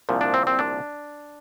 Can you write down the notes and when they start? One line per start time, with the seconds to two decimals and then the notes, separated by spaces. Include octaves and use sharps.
0.09 C2 A#2 F3
0.21 D4
0.34 C4
0.47 C4
0.59 D4